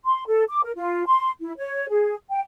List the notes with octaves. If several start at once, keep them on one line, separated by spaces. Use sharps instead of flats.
C6
A4
D6
A#4
F4
C6
E4
C#5
G#4
G5